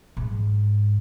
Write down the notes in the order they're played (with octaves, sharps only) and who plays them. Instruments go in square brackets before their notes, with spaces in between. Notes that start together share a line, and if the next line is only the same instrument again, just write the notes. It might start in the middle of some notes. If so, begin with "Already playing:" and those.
[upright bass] G#2